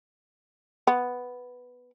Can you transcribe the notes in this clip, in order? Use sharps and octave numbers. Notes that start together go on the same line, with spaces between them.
B3